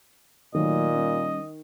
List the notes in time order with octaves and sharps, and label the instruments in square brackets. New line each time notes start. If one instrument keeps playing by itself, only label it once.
[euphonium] A#2 [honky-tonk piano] D#3 [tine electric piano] F#3 A3 [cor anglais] D#5
[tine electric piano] G3 C#4